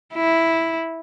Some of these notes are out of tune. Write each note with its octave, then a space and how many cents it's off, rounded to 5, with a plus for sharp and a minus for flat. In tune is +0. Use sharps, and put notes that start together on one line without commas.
E4 -5